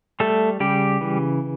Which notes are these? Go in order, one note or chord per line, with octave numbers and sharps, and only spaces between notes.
G3 A3 A4
C#3 G3 G4
E3